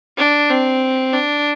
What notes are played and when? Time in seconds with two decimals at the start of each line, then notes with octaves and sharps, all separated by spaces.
0.18 D4
0.49 C4
1.13 D4